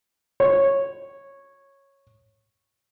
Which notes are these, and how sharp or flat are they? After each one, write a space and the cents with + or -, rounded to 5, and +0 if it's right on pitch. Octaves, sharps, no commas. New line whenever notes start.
C#5 -10